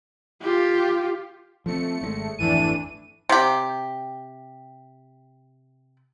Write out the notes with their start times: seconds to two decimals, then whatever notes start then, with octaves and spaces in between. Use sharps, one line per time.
0.42 F4 G4
1.66 F3 A3 C4 C#7
2.01 G#1 D#3 G#3
2.39 G#1 F2 E3 A3 D4 D#7
3.29 C3 G4